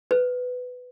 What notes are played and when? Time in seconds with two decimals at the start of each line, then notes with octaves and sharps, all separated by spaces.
0.11 B4